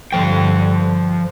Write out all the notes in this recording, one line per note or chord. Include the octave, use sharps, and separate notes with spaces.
G2 D3 F3 G5